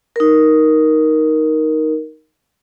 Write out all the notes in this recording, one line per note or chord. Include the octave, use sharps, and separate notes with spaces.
D#4 A#4